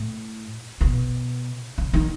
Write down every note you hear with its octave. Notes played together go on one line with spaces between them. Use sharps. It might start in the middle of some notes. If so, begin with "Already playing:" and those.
Already playing: A2
B2
C#3
D#3